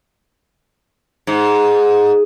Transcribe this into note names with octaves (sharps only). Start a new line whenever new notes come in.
G#2